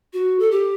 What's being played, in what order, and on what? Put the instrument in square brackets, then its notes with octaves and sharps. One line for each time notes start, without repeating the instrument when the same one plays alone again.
[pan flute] F#4
A4
G4